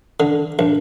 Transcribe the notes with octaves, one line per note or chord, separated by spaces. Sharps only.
D3
A#1